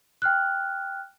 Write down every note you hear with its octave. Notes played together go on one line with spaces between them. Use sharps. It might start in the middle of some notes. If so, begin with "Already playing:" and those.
G5 F6 F#6